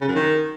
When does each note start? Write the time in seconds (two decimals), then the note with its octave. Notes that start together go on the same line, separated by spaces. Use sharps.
0.01 C#3
0.08 F#2
0.15 D#3